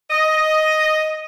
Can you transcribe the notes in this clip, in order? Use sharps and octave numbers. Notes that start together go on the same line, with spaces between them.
D#5